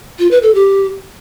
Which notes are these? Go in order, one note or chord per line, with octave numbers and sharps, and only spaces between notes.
F4
B4
A4
G4